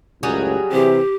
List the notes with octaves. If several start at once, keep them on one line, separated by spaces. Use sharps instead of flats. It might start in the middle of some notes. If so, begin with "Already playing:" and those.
C#2 F#2 A2 F#3 G3 G#4
C3 E3 C4 G4